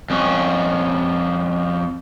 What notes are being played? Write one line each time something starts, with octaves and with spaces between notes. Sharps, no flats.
F2 C#4